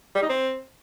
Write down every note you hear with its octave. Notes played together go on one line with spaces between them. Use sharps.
G3
D#4
C4